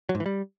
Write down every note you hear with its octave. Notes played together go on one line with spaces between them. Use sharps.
F#3
G#2
E3
G3